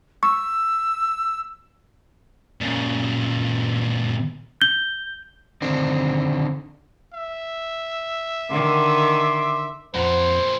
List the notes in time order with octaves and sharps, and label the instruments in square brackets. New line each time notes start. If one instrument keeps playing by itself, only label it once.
[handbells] C#6 [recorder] E6
[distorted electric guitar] A#2 C#3
[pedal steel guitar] G6 [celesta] G7
[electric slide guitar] D3 D#3 C4 D4
[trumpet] E5
[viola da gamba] D3 D#3 [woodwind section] C6 D6
[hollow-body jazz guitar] F2 F#5 A#5 [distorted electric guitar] A#2 E3 [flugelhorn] C5